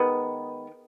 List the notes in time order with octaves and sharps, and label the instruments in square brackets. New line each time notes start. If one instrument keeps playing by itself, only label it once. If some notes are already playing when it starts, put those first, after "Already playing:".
Already playing: [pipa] D#3 G#3 B3